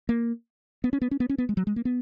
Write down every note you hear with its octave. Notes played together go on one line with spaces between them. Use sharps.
A#3
B3
C#4
B3
C#4
B3
C#4
B3
G#3
F#3
G#3
A#3
B3